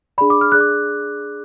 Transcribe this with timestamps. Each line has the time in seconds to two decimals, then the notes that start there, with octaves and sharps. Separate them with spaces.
0.18 D4 G#4 D5 B5
0.30 D6
0.41 F6
0.52 D4 G#4 D5 F#6
0.60 D6